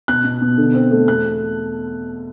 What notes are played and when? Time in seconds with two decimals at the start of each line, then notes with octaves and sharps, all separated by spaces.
0.08 B2 F#6
0.25 B2
0.42 B2
0.58 D3
0.74 C4
0.91 A3
1.08 E2 F#6